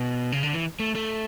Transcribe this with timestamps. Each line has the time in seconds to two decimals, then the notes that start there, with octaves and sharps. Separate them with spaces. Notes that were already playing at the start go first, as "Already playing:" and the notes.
Already playing: B2
0.32 C#3
0.43 D3
0.53 E3
0.80 A3
0.95 A3